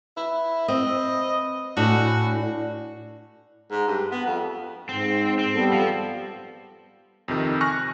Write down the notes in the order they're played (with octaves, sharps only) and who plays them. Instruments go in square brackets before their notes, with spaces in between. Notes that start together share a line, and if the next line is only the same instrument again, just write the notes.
[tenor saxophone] E4 [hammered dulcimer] B4
[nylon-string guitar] C4 [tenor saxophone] D#5
[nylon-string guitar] A2 [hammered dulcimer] D4 G#5 [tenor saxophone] F#4
[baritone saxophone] G#2
G2
B3
F2
[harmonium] G#2 [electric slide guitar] C4
[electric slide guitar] C4
[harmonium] G3 B3 A4
[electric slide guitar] F3
[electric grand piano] F2 C3 D#3
G#5 C#6 F6 F#6 A#6